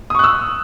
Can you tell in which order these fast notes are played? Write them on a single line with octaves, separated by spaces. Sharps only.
D#6 C#6 F#6 E6